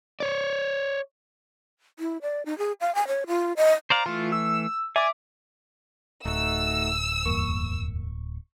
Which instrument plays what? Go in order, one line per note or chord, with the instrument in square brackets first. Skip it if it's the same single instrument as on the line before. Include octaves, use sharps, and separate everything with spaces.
[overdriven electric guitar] C#5 D5
[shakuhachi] E4
D5
D#4
G#4
F5
G#5
C#5
F4
D#5
[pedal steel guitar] C5 D5 F5 [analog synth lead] A#5
[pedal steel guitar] E3 A3 [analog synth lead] F4
[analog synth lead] E6
[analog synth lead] D5 [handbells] E5 D6 [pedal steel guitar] G#5
[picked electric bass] D1 [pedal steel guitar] A3 D#4 F#4 [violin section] E6
[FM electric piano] E2 G2 A#3 [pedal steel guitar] C#6